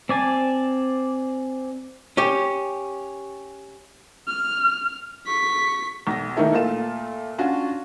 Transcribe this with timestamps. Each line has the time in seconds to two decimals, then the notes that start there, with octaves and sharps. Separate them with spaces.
0.09 C4 D5 G#5 A5
2.17 C#4 G4
4.27 F6
5.27 C#6 B6
6.07 B1 A#6
6.37 D#3 A3 A#3 D#4 E4 A4
6.53 A#2 A3 F4 E7
7.38 C#4 D4 F4 F#4